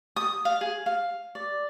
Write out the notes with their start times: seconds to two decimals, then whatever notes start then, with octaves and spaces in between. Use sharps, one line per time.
0.16 D#6
0.45 F5
0.61 G#4
0.86 F5
1.35 D5